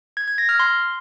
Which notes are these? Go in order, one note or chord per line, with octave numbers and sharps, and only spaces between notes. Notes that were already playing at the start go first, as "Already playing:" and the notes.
G#6
G#6
A#6
F6
C6